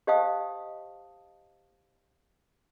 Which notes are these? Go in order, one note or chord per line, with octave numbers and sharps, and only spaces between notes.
G4 C5 D#5 F5 A5 D#6